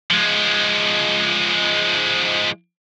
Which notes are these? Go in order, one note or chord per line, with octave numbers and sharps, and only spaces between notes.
F3 G#3